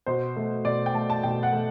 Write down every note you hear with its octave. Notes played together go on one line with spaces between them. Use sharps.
B2 C5
A3
B2 D5
G5
A3 A5
A5
B2 G5
F#5
A3